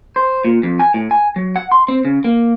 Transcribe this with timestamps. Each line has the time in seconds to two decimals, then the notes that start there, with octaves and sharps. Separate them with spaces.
0.16 C5
0.45 A#2
0.63 F2
0.79 G#5
0.94 A2
1.11 G#5
1.36 F#3
1.56 F#5
1.72 C6
1.88 C4
2.05 C#3
2.24 A#3